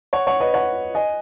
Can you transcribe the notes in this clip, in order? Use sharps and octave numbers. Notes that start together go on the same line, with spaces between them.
C#5 F#5
C#5 F#5
B4 D#5
C#5 F#5
D#5 G#5